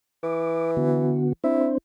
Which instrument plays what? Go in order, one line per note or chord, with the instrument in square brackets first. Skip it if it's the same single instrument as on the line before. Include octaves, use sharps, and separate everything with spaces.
[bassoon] E3 [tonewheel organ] D6
[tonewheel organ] D3 B3 F#4
[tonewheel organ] C4 D4 C5 [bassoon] E4